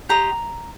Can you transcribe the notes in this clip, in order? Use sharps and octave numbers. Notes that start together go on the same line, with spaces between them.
G4 C5 D#5 A#5